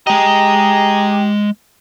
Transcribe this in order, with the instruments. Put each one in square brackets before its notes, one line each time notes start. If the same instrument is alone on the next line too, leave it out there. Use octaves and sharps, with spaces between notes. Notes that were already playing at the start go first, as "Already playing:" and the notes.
[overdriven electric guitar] G#3 D#5 [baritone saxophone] G4 [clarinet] A#5